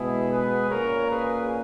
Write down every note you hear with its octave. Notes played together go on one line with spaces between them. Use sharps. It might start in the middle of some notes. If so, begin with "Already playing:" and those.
Already playing: B2 G#3 B3 E4 G#4
G#4 B4
A#2 A#3 C#4 A#4 C#5
G#4 B4